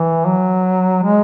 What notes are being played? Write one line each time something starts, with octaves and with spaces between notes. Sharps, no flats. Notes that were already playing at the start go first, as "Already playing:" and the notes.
Already playing: E3
F#3
G#3